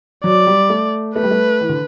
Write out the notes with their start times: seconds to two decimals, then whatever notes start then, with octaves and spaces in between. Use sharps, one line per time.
0.24 F#3 D5
0.47 G3
0.69 A3
1.16 A3 B4
1.23 G3
1.31 A3
1.61 E3
1.69 D3